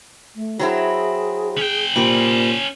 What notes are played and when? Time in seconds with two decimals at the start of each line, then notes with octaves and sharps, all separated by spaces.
0.35 A3
0.59 F#3 C4 E4 G#4
1.57 C#4 G5
1.96 A#2 G3 C4
2.48 C#5